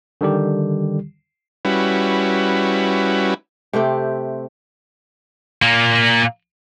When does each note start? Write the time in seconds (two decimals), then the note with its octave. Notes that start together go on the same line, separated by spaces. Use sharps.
0.21 D3 D#3 G3 G4
1.65 G3 C#4 E4 F#4 B4
3.73 C3 A3 C4 G4
5.62 A#2 A#3